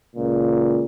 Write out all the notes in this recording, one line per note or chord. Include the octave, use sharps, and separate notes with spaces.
C#2 A#2